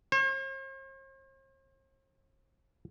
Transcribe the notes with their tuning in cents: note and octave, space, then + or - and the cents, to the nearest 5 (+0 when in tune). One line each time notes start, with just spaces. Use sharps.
C5 +45